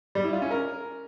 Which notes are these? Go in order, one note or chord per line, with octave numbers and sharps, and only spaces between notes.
G3
E4
F4
C#4
A#4